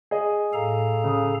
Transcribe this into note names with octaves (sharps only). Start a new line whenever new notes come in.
G#4 D#5
A2 A4 F5 A#5
C#3 D#6